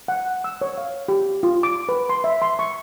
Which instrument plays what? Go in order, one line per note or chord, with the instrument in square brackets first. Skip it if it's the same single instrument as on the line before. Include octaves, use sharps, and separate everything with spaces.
[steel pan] F#5
E6
C#5
F5
G4
F4
D6
B4
C6
E5
C6
C#6